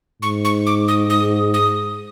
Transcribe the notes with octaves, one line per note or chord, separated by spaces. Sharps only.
G#2 C#6
C#6
D6
D#6
D#6
D#6